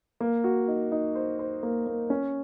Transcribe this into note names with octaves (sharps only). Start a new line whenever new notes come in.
A#3
F#4
D#4
D#4
C5
C5
A#3
A#3
C#4